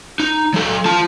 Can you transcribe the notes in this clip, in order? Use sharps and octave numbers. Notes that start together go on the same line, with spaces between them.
D#4
F#3 A4
F4 A5